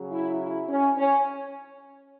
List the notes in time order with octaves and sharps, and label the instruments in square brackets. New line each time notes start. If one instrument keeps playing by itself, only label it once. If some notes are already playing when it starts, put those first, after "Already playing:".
Already playing: [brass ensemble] C#3 F#3
E4
E4
C#4
C#4